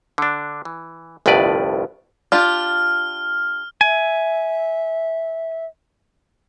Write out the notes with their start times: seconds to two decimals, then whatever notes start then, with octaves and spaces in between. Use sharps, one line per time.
0.18 D3 D4
0.65 E3
1.26 G1 C2 F2 A2 B4 D5
2.32 D4 F4 G4 F6
3.81 E5 G#5